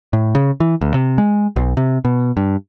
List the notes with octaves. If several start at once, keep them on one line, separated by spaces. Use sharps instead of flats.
A2
C#3
E3
D2
C3
G#3
B1
C3
B2
G2